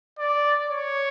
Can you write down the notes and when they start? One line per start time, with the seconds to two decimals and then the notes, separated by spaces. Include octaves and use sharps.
0.19 D5
0.69 C#5